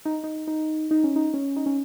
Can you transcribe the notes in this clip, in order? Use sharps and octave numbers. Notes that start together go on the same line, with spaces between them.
D#4
D#4
D#4
D#4
C#4
D#4
C#4
D#4
C#4